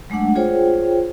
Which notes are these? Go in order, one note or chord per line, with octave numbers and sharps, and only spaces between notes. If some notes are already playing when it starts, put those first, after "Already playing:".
F#3 G#3 A3 D4 F#5
F4 G#4 C5 C#5 G5